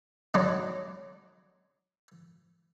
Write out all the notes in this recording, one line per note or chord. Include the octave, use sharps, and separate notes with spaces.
F#3 D4 D#4